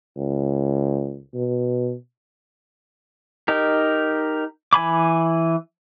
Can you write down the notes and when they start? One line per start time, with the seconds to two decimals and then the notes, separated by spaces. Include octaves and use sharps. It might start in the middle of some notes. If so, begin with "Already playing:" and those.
0.17 C#2
1.34 B2
3.48 D#4 G4 A#4
4.73 E3 G#5 B5 D6